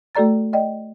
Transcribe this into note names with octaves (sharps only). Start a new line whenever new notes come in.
A3 F#4 A4 D5 A#5 A6
D5 D#5 G5